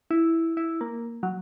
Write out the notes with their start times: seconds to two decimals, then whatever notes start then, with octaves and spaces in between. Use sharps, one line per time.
0.11 E4
0.57 E4
0.81 A#3
1.23 F#3